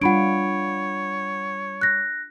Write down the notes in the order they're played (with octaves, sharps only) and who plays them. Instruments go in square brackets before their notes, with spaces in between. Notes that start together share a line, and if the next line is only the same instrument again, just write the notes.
[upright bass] G3 [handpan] D4 F4 [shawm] C#5 [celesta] F#5 B5 D7
[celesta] F#6 A#6